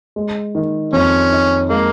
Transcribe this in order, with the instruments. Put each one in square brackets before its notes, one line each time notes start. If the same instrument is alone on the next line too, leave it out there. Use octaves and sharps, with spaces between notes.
[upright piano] G#3
D#3
[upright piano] F2 [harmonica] C#4
[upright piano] D#4
[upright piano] G#3 [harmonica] A#3